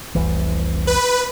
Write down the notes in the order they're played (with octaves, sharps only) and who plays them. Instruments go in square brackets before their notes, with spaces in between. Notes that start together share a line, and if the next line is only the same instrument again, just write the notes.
[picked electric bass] F1 C2 E3
[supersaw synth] B4